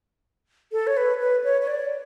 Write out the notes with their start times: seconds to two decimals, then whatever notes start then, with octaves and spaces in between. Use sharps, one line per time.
0.72 A4
0.87 C#5
0.97 B4
1.20 B4
1.44 C#5
1.61 C#5
1.67 D5